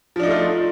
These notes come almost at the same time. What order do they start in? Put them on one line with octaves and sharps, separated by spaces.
F3 D4 D#4 A3 F4